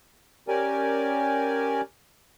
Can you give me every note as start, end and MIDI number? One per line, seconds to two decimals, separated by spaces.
0.48 1.81 61
0.48 1.81 67
0.48 1.81 70
0.48 1.81 74
0.48 1.81 80